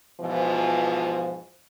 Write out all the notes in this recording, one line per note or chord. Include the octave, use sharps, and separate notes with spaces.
G#2 B2 E3 F3